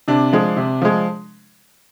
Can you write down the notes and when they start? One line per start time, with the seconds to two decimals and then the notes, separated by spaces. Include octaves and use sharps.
0.08 C3 D4
0.33 F3 G#3
0.57 C3
0.82 F3 G#3